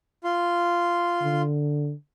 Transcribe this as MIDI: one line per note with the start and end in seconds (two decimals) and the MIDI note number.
0.24 1.42 65
0.24 1.42 84
1.22 1.92 50